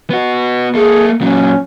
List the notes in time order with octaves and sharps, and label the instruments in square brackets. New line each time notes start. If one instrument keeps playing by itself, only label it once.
[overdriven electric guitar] B3 F#4
[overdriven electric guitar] A#3 A4 [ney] G#4
[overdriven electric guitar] A#2 F#3 [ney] C#4